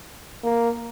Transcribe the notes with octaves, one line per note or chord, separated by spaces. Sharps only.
A#3